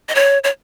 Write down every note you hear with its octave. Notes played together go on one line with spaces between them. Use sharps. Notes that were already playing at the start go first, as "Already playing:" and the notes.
D#5
C#5
C#5